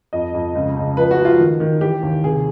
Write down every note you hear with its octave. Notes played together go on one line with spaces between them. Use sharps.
F2 D#5
F2
C#2
C#2
F3 B4
F#4
F3
F4
D#3
D#3
E3 G4
D#2
C3 G#4